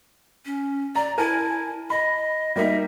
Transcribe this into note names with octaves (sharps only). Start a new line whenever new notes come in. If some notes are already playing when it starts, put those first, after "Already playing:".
C#4
D5 A#5
E4 A#4 G#5 A5
D#5 B5
G3 A#3 D#4 E5